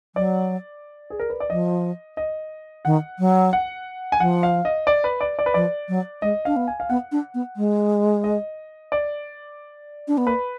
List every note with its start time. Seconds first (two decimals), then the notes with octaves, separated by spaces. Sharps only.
0.15 F#3 D5
1.10 G#4
1.19 A#4
1.30 B4
1.40 D5
1.50 F3 D#5
2.17 D#5
2.85 D#3 F#5
3.19 F#3
3.53 F#5
4.12 G#5
4.20 F3 F#5
4.43 F5
4.65 D#5
4.87 D5
5.04 B4
5.21 D5
5.39 D5
5.46 B4
5.54 F3 D5
5.89 F#3
6.22 G#3 D#5
6.45 D4 F5
6.56 B3
6.68 G#5
6.80 F5
6.90 B3 F#5
7.12 D4
7.34 B3
7.57 G#3
8.24 D#5
8.92 D5
10.08 D4
10.18 B3
10.27 A#3 B4